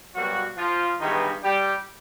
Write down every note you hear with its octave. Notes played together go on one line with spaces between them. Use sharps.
B2 F#3 G3 A#3 F#4
F3 F4
G2 D#3 E3 G#3 B3 D#4
G3 G4